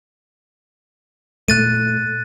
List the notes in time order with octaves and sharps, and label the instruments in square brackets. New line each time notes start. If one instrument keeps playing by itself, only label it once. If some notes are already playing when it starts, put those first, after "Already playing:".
[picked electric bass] A#2 A3 [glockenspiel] F#6 A6 D#7